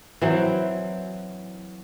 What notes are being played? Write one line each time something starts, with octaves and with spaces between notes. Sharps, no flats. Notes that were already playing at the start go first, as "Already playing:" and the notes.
E3 F#3 C4 C5